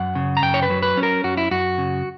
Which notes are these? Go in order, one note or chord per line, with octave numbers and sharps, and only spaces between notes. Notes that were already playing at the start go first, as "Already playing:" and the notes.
Already playing: F#2 F#5
C#3
A#5
F#2 G5
C#5
B4
F#3
B4
C#4
A#4
F#2 F#4
E4
F#2 F#4
C#3